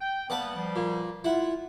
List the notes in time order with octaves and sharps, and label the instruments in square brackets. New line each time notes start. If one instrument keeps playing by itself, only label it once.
[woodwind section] G5
[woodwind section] G3 A#3 B3 [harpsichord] B4 F#5 A5
[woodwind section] F3 G3
[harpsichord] A#2
[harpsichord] E4 F#5 [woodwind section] F4